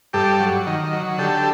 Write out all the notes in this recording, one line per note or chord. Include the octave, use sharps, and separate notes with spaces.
G2 G4 A4
F#3
D#3
F#3
D3 G4 A4